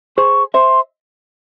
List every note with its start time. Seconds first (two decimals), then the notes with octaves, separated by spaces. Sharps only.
0.17 G#4 C5 C#6
0.54 C5 E5 C6